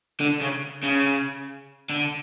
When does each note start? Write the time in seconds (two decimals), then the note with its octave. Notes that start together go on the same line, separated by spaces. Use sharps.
0.20 D3
0.41 C#3
0.84 C#3
1.90 D3